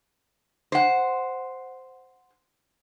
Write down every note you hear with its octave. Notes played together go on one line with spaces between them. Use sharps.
C5 F#5